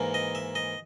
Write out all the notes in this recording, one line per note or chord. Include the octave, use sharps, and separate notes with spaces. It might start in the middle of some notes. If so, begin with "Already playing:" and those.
Already playing: G#2 E3 A#3
D#5
E5
D#5